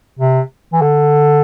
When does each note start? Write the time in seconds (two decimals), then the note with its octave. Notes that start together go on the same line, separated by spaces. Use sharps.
0.19 C3
0.73 E3
0.81 D3